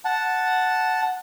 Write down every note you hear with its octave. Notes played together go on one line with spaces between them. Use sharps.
F#5 A5